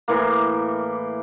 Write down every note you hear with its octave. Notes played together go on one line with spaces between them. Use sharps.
A2 E3 A#3